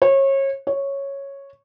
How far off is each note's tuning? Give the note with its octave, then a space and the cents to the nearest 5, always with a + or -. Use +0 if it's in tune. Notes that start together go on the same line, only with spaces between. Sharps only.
C#5 -30
C#5 -5